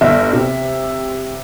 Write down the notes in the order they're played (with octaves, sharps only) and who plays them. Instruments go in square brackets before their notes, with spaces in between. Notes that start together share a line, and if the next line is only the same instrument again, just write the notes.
[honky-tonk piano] G1 [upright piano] E5
[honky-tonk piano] C3